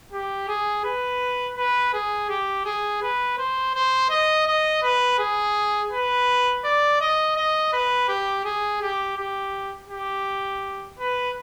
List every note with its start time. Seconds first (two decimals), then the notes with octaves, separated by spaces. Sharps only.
0.12 G4
0.48 G#4
0.84 B4
1.57 B4
1.93 G#4
2.29 G4
2.65 G#4
3.02 B4
3.38 C5
3.75 C5
4.10 D#5
4.46 D#5
4.83 B4
5.19 G#4
5.92 B4
6.64 D5
7.01 D#5
7.37 D#5
7.73 B4
8.08 G4
8.45 G#4
8.82 G4
9.17 G4
9.89 G4
10.99 B4